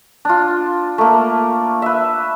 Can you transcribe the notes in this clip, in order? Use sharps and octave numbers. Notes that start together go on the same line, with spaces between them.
D4 F4
A3 A#3
B4 E5